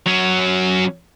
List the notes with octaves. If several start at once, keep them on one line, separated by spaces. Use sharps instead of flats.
F#3 C#4